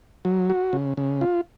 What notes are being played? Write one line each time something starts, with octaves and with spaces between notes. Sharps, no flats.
F#3
F#4
C#3
C#3
F4